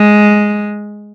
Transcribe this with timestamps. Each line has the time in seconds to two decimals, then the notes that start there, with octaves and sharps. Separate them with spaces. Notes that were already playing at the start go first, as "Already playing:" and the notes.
Already playing: G#3